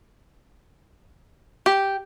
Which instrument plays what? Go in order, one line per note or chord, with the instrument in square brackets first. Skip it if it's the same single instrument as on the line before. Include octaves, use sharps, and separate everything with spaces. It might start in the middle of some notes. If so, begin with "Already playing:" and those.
[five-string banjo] G4